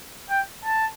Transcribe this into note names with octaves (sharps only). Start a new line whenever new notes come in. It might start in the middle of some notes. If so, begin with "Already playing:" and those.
G5
A5